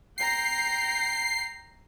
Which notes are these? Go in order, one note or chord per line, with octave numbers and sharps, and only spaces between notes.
G5 A#5 G6 C7